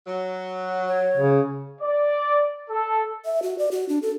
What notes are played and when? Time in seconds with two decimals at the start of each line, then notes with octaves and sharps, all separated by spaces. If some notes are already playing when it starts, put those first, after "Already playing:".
0.07 F#3
0.88 C#5
1.17 C#3
1.81 D5
2.70 A4
3.25 E5
3.43 F#4
3.59 D5
3.71 F#4
3.89 D4
4.02 A4